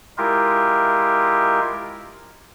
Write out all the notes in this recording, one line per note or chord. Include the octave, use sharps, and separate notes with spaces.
G#3 E4 F4 G4 A#4